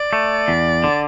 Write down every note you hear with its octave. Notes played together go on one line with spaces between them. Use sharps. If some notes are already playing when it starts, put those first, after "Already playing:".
Already playing: D5
A3
E2
D3